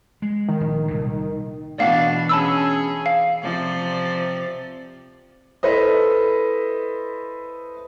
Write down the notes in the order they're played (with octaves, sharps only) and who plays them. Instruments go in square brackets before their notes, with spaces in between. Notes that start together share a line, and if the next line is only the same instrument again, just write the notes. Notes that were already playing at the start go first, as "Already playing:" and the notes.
[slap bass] G#3
[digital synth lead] D#3
[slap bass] A#1
C2 A#2
[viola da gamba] B2 E3 D4 [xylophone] D5 F5 F#5
[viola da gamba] C#4 G#4 [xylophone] A5 B5 E6
[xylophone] F5
[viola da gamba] C3 F3 D5
[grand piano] E4 A4 B4 C5 D#5